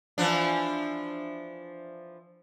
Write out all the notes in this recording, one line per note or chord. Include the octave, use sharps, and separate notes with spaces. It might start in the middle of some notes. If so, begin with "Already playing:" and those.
E3 F3 D4